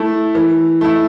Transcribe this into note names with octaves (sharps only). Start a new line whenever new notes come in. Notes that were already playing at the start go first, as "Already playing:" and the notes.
Already playing: A3 E4
E3
A3 E4